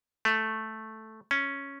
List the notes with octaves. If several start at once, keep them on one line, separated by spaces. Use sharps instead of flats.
A3
C#4